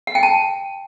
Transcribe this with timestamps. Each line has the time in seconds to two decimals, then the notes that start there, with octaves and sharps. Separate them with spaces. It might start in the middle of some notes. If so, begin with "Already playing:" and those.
0.07 F#5
0.15 G5
0.23 A5